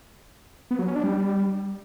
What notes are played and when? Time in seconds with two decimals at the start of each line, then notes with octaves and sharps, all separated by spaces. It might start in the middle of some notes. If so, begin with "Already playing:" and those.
0.71 B3
0.79 F#3
0.87 C#4
0.95 D4
1.04 G3